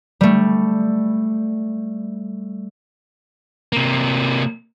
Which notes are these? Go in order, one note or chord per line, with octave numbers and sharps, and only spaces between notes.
G3 A3
C3 A#3